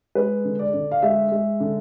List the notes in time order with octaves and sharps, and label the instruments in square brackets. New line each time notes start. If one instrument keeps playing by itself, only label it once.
[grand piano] G#3 B4
D3
D5
D3
F5
G#3 E5
G#3
D3